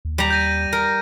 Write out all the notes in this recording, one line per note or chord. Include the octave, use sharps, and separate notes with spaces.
D#2
G3 A#5
G6 A#6 D#7
A#4